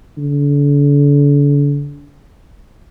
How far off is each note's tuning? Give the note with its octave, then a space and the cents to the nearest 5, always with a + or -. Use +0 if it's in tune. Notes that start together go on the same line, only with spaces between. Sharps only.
D3 -40